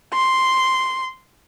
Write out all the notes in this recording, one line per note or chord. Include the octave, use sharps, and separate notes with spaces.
C6